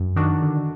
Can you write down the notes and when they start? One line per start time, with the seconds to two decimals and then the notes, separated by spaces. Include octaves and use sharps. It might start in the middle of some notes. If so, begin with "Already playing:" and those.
Already playing: F#2
0.16 D#3 D4 F#4
0.42 D3